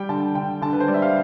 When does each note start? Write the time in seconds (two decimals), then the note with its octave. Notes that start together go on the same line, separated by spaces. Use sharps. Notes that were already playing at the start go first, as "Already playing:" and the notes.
Already playing: G3 G5
0.09 D3 A5
0.35 D3 G5
0.62 D3 A5
0.73 B4
0.80 C5
0.88 G3 D5
0.94 E5
1.02 F5